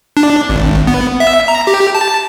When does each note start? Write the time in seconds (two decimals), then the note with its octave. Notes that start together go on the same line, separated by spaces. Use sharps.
0.17 D4
0.49 G#1
0.87 B3
1.20 E5
1.48 A#5
1.67 G4
1.95 A5